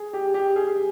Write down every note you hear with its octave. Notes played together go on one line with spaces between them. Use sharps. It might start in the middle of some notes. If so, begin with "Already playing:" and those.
Already playing: G#4
G4
G4
G#4